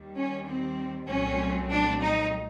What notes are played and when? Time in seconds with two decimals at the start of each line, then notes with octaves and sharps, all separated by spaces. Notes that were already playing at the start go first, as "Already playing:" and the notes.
Already playing: D#2 D#3 G3
0.16 C#4
0.47 C4
1.08 C2 A#2 F#3 A3 C4 C#4
1.71 D4
2.02 D#4